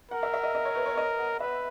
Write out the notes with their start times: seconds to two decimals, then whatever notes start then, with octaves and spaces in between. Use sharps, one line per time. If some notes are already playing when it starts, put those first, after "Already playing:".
0.11 A#4 F#5
0.23 E5
0.34 E5
0.44 D#5
0.55 D#5
0.65 C#5
0.76 B4
0.86 C#5
0.97 D#5
1.19 F#5
1.40 B4 E5